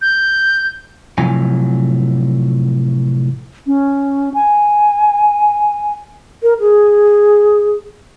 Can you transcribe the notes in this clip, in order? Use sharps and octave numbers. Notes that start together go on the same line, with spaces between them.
G6
A2 C3 F3 F#3 G#5
C#4
G#5
A#4
G#4